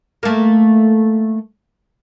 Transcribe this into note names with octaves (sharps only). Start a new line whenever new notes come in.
A3 A#3